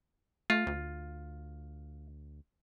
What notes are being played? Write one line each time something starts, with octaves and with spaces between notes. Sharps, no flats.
A3 F4
D2